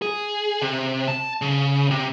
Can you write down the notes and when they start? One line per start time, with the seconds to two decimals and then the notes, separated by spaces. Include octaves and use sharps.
0.02 G#4
0.62 C3
1.08 A5
1.42 C#3
1.91 C3